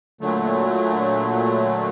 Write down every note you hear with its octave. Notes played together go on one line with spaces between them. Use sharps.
A#2 D3 F#3 A3